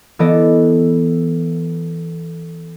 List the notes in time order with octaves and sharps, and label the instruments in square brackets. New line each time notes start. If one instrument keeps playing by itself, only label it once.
[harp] E3 B3 A4 D5 D#5